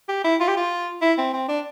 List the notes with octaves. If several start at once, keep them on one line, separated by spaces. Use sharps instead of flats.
G4
E4
F4
G4
F4
E4
C4
C4
D4